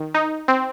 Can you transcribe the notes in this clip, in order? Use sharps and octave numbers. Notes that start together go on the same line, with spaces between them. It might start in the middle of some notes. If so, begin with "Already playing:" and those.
Already playing: D#3
D#4
C4